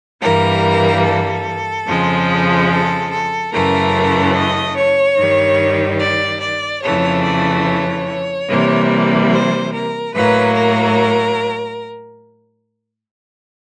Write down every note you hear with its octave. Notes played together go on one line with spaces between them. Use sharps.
G2 E3 G3 A#3 A#4
A4
F2 C#3 F3 G#3
A4
A4
F#2 C#3 E3 A3 A#4
D#5
C#5
G2 D#3 G3
D5
D5
F2 C#3 E3 A3 C#5
D5
C#5
C3 E3 G3 A#3
C5
A#4
A2 F#3 A#3 B4
A#4